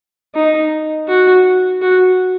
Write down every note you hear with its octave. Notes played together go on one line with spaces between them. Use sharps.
D#4
F#4
F#4